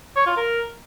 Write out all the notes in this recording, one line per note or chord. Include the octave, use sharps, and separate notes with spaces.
C#5
F4
A#4